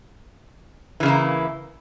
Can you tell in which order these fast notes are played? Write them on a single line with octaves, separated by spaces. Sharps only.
E3 C#3 E4 A#3